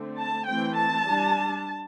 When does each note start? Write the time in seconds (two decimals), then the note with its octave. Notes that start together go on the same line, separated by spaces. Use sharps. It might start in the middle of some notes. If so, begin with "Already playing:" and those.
Already playing: D3 A3 C4
0.19 A5
0.49 E3 A3 C4 G5
0.77 A5
1.07 G3 D4